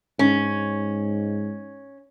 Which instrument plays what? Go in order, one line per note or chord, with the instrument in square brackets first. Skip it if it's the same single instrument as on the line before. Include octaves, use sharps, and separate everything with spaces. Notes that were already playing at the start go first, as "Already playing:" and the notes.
[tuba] G#2 [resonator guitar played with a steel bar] C#4